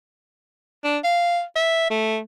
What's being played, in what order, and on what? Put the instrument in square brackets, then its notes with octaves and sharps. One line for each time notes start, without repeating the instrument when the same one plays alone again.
[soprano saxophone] D4
F5
E5
A3